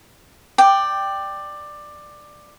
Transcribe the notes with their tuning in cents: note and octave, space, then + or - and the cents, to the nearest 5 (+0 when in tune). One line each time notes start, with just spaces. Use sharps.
D5 +15 G5 +0